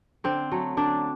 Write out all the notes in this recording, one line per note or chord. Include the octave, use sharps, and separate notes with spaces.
D3 C4
F#3 A3
D3 D4